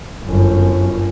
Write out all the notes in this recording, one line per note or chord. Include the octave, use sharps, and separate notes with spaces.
G1 F#2